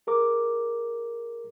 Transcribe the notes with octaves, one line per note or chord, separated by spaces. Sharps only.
G#4 A#4 D6